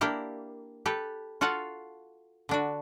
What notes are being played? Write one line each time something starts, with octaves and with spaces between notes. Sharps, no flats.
A#3 D4 E4 G4 A#4
G4 A4 B4
F4 F#4 A4 F5 F#5
D3 D4 F#4